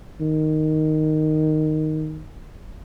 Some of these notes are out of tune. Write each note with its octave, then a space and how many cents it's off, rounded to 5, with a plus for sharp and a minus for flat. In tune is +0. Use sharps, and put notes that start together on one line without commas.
D#3 -5